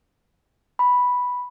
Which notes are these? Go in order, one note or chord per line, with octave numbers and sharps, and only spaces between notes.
B5